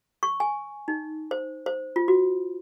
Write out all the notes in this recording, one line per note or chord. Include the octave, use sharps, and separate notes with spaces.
C#6
G#5
D#4
C5
C5
F4
F#4